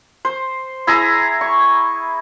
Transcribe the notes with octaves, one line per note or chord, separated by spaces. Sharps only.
C5
E4 G#4 A#5
C#6